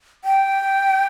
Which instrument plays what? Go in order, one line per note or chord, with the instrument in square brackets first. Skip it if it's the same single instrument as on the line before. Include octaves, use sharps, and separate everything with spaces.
[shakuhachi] G5